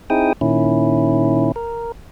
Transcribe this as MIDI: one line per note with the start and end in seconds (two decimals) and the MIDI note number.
0.10 0.33 60
0.10 0.33 63
0.10 0.33 64
0.10 0.33 68
0.10 0.33 79
0.10 0.33 87
0.41 1.52 46
0.41 1.52 51
0.41 1.52 61
0.41 1.52 64
1.56 1.92 70